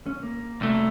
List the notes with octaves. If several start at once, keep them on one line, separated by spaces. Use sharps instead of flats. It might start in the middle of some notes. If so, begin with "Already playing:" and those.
C#4
A#3
C2 A3